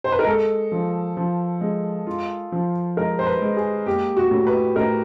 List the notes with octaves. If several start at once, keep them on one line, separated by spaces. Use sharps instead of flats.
C5
B4
A#4
G#3 A4
F3
F3
G#3
F4
F3
G#3 A#4
C5
B4
G#3
G#4
A#3 G4
F#4
A2
B4
A2 A#4